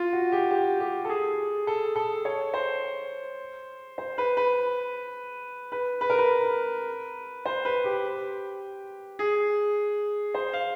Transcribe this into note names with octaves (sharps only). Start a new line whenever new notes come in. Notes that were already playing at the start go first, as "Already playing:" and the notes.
Already playing: F4
F#4
G4
G4
G4
A4
G#4
A4
A4
C#5
C5
C5
B4
B4
B4
B4
A#4
B4
C5
B4
G4
G#4
C5
F5